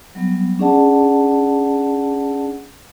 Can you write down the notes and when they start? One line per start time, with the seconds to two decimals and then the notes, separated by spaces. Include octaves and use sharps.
0.15 F#3 G3 B3
0.59 C#4 D4 G#4 D5 F#5 A5